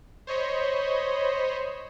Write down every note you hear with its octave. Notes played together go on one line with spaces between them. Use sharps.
C5 C#5 D#5 B5